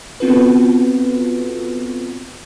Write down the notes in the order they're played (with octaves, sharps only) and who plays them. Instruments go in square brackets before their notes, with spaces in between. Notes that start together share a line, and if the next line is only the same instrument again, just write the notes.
[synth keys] B3 C4 F4 F#4 A4 B4